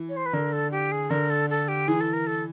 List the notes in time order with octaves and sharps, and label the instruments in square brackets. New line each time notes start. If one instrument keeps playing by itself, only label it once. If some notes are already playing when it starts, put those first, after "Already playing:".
Already playing: [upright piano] E3
[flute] C#5
C5
B4
[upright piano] D3 [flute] A#4
[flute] A4
G4
G#4
[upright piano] D3 [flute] A#4
[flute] A4
A4
G4
[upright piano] E3 [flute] G#4
[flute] A4
A#4
A4